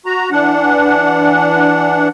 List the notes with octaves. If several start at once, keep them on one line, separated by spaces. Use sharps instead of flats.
F#4 A#5
E3 D4 F#5